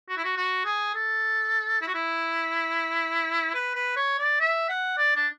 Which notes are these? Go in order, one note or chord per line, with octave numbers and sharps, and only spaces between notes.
F#4
E4
F#4
F#4
G#4
A4
E4
F#4
E4
B4
B4
C#5
D5
E5
F#5
D5
D4